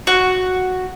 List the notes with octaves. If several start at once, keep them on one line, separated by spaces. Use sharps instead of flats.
F#4